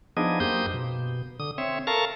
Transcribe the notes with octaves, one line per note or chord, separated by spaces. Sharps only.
F3 B3 D4 D#4 G#4 D#5
F#2 A#3 G4 C5 D#6 G6
B2
D3 D#6
C4 C#5 E5
A4 A#4 F5 A5 A#5 C#6